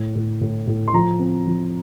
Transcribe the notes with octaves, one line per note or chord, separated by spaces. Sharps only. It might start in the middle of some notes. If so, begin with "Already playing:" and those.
Already playing: A2
A2
A2
A2
C6
F3 A#5
C4
F3